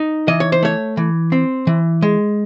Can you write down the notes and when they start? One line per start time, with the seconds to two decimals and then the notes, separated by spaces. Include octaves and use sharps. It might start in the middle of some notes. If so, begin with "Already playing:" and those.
Already playing: D#4
0.28 E3 D#5
0.40 C#5
0.52 C5
0.63 A3 C#5
0.97 E3
1.32 C4
1.67 E3
2.02 G#3